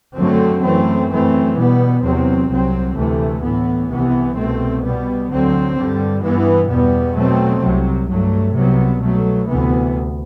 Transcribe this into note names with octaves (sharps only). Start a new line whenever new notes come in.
F#2 D3 F#3 A3 C4
F#2 E3 A3 C4
F#2 E3 A3 C4
B2 G3 B3
E2 C3 F#3 C4
C2 C3 F#3 C4
D2 C3 E3 A3
A2 E3 B3
C2 C3 E3 B3
C2 B2 A3 C4
B2 G3 B3
D2 D3 F#3 C4
G2 D3 G3
G2 E3 B3
E2 B2 G3 B3
B2 F#3 A3 C4
C2 C3 F#3
G2 F#3 A3
C2 C3 F#3 B3
B2 F#3 A3
D2 C3 E3 B3